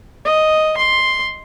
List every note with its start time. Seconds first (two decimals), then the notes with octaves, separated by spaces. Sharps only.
0.25 D#5
0.77 C6